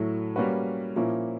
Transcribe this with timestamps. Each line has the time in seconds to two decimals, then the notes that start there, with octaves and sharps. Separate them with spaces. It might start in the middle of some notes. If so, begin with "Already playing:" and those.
Already playing: A2 F#3 A3
0.36 G3 A#3 C#4 F#4 B4
0.96 A#2 F3 A#3 C#4 E4